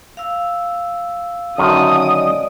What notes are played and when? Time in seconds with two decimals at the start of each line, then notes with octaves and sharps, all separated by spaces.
0.17 F5 E6
1.58 F#2 D3 D#3 D#6
2.02 D5 D#5